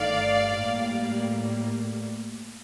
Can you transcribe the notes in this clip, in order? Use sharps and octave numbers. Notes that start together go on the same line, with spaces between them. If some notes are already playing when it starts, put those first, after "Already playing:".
Already playing: G1 G2 D#3 A3 D#4 D5 F5
A2 G3 A#3